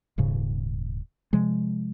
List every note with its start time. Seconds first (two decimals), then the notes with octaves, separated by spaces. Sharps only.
0.18 D#1 G#2 C#3
1.33 C3 F3 G#3